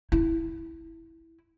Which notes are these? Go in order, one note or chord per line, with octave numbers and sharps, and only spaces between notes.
E4